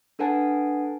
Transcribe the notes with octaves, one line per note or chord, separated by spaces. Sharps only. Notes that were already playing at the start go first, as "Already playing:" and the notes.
D4 A4 B4 F#5 G#5 A5